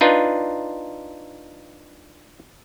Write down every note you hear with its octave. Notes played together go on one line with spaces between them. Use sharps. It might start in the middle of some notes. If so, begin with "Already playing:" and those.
D4 D#4 F4 B4